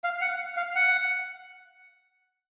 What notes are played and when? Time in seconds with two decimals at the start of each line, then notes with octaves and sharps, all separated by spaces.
0.04 F5
0.21 F#5
0.57 F5
0.75 F#5